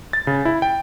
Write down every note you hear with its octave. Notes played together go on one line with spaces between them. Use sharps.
A6
C#3
E4
G5